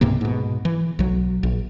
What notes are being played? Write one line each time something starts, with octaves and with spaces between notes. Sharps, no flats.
C#2 G#2 C3 A#3
G#2 B2
E3
B1 F#3
A#1